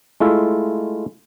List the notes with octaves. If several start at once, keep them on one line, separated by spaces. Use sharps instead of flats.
G#3 A3 E4 F4 E5